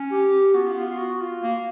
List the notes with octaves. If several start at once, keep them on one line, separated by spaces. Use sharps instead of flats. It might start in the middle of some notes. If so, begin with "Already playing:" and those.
Already playing: C#4
G4
B3 F#4
F4
F4
F4
F#4
F4
A#3